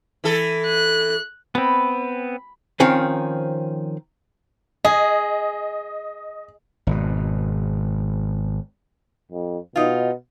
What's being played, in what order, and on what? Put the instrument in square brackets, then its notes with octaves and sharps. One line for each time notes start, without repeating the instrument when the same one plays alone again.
[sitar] E3 A4
[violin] F#6
[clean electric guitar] B3 C4 [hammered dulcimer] B5
[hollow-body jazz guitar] D#3 F3 C4 C#4
[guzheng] G#4 [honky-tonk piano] D#5
[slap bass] G#1 B2
[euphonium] F2
[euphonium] B2 [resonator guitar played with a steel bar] D#4 F4